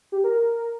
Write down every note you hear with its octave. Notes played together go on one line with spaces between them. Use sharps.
G4
A#4